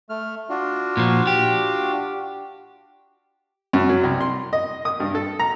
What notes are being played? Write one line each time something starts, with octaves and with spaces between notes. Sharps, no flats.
A3 F6
D4 F4 F#4
A#2 F3
G4
F#2
F#3
C2
C6
D#5
D#6
G2
A4
A#5